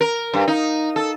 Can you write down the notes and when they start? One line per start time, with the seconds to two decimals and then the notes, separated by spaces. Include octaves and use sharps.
0.01 A#4
0.34 G2
0.48 D#4
0.96 A4